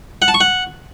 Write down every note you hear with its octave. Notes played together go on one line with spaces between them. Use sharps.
F#5
A5
C#6
F#5